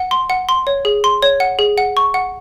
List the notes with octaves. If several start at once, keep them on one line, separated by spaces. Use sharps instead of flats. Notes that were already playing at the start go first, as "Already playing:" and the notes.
Already playing: F#5
C6
F#5
C6
C#5
G#4
C6
C#5
F#5
G#4
F#5
C#6
F#5